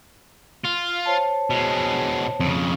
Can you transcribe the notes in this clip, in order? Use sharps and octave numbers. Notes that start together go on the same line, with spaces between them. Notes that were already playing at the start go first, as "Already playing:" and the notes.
F4
C5 C#5 A5
B2 G#3
F2 C#3